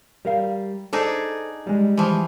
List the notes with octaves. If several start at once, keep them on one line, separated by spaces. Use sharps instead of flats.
G3 A#4 F5
D4 D#4 G#4 A4 C5
G3 G#3
E3 F3